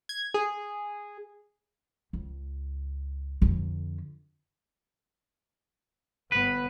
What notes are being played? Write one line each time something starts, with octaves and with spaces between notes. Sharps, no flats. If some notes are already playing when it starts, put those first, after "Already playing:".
G#6
G#4
C#2
F2 D3
G1 B3 B4